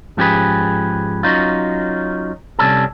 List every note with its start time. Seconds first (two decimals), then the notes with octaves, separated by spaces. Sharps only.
0.17 G#2 F3 C#4 G4 G#4 B4
1.23 F#3 C#4 D#4 F4
2.59 C2 C3 G3 C#4 A4